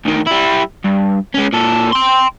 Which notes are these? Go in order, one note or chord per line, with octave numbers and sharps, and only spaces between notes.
D2 D#3
G3 E4
G2
G#3 C#4
A#2 A4
G5 C6